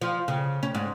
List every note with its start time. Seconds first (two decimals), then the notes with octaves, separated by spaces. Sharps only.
0.01 F3
0.28 C#3
0.63 C#4
0.75 G#2